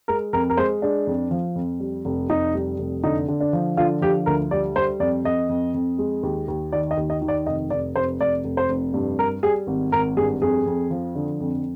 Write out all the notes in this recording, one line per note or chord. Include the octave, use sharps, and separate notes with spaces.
G#3 A#4
F2 A#4
A#4
G#3 C5
G#3 D4
F2
F3
F2
G3
F1
F1 D#4
G3
F1
D3 D#4
D3
D4
F3
D3 F4
F3 G4
D2 A#4
G3 D5
G3 C5
F2 D5
F2 D#5
F2
F2
G#3
D#2
D#2
D#3 D5
D#5
D#2
D#5
D#3
D5
F1 D#5
F1 D5
F1 C5
F1 D5
F1
C5
F1
G2
G3 A#4
G3 G#4
G#1
G#1 A#4
G2 G#4
F2 G#4
F2
F3
D3
F2